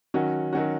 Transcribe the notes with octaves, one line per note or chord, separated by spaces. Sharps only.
D#3 F#3 C#4 F#4
D#3 F#3 C#4 F#4